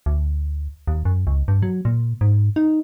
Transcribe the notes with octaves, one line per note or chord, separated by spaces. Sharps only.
D2
D#2
F#2
C#2
G2
F#3
A#2
G#2
D#4